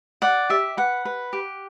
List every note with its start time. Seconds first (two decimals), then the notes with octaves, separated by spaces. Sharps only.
0.22 D5 F#5
0.50 G4 E5
0.77 B4 F#5
1.05 B4
1.33 G4